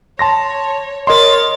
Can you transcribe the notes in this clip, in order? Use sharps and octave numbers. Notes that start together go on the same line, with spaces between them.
C#5 A5 C6 A#6
A#4 C#5 D#5 C6 A6